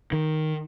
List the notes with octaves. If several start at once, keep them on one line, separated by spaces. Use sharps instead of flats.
D#3